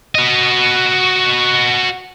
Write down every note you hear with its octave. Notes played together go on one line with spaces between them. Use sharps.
F#4 D#5